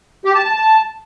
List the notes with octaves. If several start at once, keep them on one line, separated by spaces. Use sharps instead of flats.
G4
A5
A5
A5